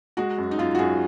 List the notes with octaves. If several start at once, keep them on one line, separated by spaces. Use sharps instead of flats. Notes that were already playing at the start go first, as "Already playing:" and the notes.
G#3 F#4
F#2
D#4
F#2 F4
F#4
F#2 G#4